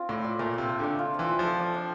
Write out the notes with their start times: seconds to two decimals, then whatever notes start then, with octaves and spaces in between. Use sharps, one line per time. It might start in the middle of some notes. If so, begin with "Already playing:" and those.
Already playing: C4 F4
0.09 A2 D5
0.24 D5
0.39 A#2 A3
0.54 C3 D5
0.69 A3
0.79 D3 D5
0.99 F4
1.14 E3 C4
1.29 C4
1.39 F3
1.44 A4
1.59 D5
1.74 D4